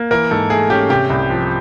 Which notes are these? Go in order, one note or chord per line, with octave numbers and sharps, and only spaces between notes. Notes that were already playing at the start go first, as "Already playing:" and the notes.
Already playing: A#3
E3 A#4
G#2 A4
A3 G#4
C#4 G4
C3 G4
C2
F3